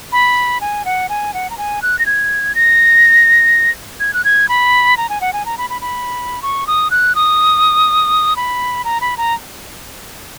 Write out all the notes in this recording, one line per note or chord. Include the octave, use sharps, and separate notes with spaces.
B5
G#5
F#5
G#5
F#5
A#5
G#5
F#6
A#6
G#6
A#6
G#6
F#6
G#6
B5
A#5
G#5
F#5
G#5
A#5
B5
B5
B5
C#6
D#6
F#6
D#6
B5
A#5
B5
A#5